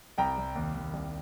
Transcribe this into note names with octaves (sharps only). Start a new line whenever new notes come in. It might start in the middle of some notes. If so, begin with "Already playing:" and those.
C2 G5 A#5
C2
D#2
D#2
C2